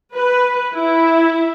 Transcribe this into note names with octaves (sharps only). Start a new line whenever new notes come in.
B4
E4